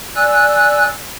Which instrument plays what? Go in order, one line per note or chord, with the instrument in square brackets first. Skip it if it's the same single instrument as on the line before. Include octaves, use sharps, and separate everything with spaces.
[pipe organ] D5 G#5 E6 F#6